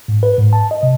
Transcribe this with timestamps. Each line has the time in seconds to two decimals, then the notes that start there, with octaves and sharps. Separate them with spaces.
0.08 G#2
0.23 B4
0.38 G#2
0.53 A5
0.71 D#5
0.83 C3